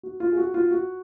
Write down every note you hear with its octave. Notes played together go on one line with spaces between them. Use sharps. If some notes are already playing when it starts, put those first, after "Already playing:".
F#4
F4
G#4
F#4
F4
F#4